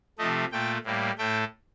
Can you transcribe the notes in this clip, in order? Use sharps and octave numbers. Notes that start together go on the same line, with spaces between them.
C3 F3 A3 D#5
A#2 A3 G5
A2 G3 A#3
A2 A3 G5